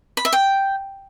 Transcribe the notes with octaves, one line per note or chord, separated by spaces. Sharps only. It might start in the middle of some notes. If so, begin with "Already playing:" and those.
B5
E5
G5